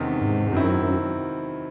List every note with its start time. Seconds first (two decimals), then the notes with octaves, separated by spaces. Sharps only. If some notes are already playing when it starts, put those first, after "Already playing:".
Already playing: E2 C3 D#3 G#3 C#4
0.21 G#2
0.52 F#2 D#3 F#3 C4 E4